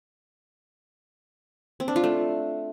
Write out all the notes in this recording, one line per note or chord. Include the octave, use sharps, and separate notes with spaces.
C4
D4
F4
A3